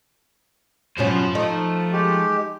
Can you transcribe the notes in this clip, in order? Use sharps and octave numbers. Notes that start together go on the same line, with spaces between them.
F#2 B2 F3 C#4 C5
A3 D#4
G#3 G4